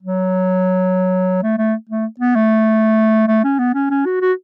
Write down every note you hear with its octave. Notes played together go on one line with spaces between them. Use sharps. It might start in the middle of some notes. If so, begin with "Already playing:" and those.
F#3
A3
A3
A3
B3
A3
A3
C#4
B3
C#4
C#4
F#4
F#4